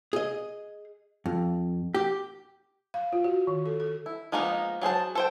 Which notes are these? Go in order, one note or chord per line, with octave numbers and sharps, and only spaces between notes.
G#4 D#5
F2
G4
F5
F4
F#4
D#3
A4
A4
E4
F3 G#3 A#3 B3 D#4
F#3 G#4 C5 A5
A4 C5 G5